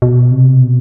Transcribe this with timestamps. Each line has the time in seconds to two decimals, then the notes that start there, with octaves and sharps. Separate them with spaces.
0.02 B2
0.32 C3
0.62 B2